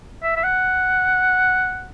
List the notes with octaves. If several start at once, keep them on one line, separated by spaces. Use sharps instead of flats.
E5
E5
F#5